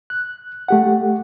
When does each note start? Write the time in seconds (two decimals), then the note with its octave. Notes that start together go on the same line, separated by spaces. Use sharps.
0.10 F#6
0.68 A3 G4 F#5